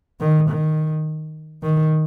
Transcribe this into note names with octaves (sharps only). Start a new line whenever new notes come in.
D#3
D#3
D#3